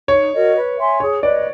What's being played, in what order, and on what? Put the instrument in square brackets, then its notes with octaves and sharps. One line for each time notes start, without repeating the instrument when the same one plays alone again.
[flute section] D#4 [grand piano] C#5
[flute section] F#4 A#4 D#5
B4
E5 G#5 C6
[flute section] G#4 [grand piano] C#5
[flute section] B4 D#5 [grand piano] D5